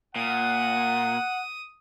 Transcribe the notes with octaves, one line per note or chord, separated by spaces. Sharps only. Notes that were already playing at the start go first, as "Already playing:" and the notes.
A#2 F#5 D#6